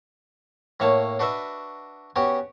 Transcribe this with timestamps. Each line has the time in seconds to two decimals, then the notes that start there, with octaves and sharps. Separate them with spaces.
0.80 A2 A#3 C#5 A5
1.19 D4 F#4 B4 D#5 E5
2.16 B3 C#4 F#4 G4